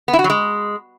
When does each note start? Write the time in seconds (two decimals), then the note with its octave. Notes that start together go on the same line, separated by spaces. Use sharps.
0.08 B3
0.13 E4
0.19 F#4
0.24 F#3
0.30 G#3